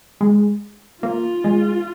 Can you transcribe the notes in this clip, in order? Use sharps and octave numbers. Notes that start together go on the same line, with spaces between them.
G#3
A#3 F4
G#3